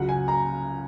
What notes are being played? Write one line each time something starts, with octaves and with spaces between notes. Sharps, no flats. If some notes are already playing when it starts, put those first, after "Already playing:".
Already playing: C#2 C#3 F#3 F#5
G#5
A#5